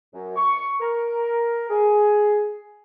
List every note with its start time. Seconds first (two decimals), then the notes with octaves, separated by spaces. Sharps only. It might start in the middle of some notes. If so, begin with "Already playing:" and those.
0.14 F#2
0.36 C#6
0.80 A#4
1.69 G#4